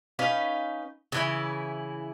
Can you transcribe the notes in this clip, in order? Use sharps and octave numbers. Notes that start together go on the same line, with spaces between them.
C#4 D#4 B4 F5
C#3 E3 E4